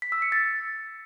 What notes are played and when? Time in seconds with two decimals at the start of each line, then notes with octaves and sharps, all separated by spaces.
0.02 B6
0.12 E6
0.22 C#7
0.32 A6